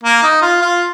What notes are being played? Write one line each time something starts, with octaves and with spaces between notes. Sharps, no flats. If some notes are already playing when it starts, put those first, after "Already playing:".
A#3
D#4
F4
F4